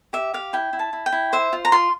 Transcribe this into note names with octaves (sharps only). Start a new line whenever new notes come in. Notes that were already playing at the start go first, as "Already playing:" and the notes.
G4 E5
G4 F5
E4 G5
E4
A5
E4
G5
E4
C5 E5
F4
A#5
F4 C6